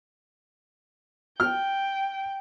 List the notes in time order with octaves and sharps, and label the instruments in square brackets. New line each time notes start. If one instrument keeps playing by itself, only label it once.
[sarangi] G5 [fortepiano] F6